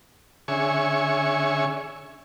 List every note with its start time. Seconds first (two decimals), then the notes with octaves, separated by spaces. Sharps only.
0.48 D3 C#4 G#4 E5 G#5 C#6